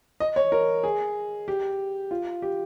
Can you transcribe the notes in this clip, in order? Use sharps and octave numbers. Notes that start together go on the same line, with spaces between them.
D#5
C#5
A#4
G#4
G4
F4
G4